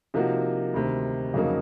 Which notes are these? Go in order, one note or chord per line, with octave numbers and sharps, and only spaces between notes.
C3 F3 A#3 D#4 F#4
D2 C3 D#3
F2 C#3 F#3 A#3 D#4